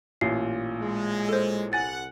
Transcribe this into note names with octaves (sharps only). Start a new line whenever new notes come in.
A1 A#2 C7
G#3
A4 C5
C2 F#5 G#5 A6